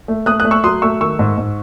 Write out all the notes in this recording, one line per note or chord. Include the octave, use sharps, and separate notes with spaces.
A3
A3 D#6 F#6
D#6 F#6
A3
C#6 E6
F#3 C6 D#6
A3 C#6 E6
D#3 C#6 E6
G#2
G#2